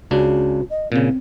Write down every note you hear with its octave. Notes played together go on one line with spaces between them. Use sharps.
C#2 C#3 D4 F#4
D#5
A#2 C#3 C4